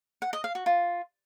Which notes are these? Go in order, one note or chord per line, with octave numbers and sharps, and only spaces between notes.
F#5
D#5
F5
F#4
F4